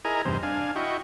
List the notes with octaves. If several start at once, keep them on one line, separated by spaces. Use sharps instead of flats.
E4 G#4 A#4 D#5 G#5 A#5
E2 G2 C3 C5
D4 F5 G#5
E4 F#4 D#5 G5 C#6